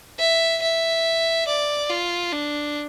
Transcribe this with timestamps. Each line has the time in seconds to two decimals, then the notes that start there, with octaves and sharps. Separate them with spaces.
0.19 E5
0.62 E5
1.48 D5
1.90 F4
2.33 D4